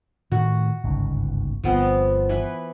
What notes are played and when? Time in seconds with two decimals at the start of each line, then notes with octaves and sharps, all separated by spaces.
0.32 A2 D#3 A3 F#4
0.84 G1 C#2 G#2
1.64 G1 F3 B3 C4
2.29 E3 B4